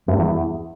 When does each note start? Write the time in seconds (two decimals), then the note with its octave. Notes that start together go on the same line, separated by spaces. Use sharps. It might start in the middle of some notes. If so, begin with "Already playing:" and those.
0.08 F#2
0.13 G2
0.18 E2